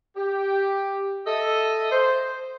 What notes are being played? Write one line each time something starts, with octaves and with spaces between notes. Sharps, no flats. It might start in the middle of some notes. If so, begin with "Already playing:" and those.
G4
A4 D#5 E5
C5